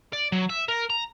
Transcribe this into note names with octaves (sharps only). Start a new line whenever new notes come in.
D5
F#3
E5
A#4
A#5